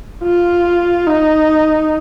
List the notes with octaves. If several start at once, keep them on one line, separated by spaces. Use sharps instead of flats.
F4
D#4